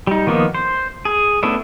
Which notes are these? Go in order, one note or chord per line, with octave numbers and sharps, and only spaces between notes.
G3 D#4
D#3 F3 A#3 B3 D#4
C5
G#4
A3 B3 C#4 D4 E4